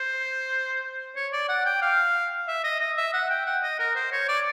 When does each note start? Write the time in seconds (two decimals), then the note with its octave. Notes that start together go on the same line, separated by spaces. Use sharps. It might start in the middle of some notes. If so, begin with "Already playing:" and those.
Already playing: C5
1.16 C#5
1.33 D5
1.49 F#5
1.66 G5
1.82 F5
2.48 E5
2.64 D#5
2.80 D#5
2.97 E5
3.14 F#5
3.30 G5
3.46 F#5
3.63 D#5
3.79 A#4
3.96 C5
4.12 C#5
4.29 D5